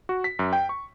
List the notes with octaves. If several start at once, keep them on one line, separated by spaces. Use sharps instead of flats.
F#4
B6
F#2
G5
C#6